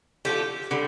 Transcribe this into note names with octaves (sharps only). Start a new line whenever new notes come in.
D3 F3 A3 G4
D3 G3